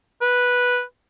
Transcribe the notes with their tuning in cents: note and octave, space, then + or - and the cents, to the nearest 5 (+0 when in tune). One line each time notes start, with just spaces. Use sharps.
B4 -5